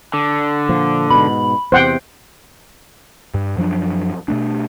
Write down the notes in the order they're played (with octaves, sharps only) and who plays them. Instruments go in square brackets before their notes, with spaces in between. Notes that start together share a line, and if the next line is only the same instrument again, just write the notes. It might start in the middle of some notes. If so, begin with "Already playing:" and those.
[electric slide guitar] D3
[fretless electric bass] A#2 F3
[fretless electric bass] G#2 B2 [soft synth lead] B5
[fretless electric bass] E2 C3 [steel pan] C5 F#5 G5
[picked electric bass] G2
F#2 F3 F#3 D4
B2 A3 D4